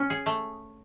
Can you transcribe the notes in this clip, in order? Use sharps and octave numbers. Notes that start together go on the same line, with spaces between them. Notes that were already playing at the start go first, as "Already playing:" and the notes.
Already playing: C#4
G#4
A3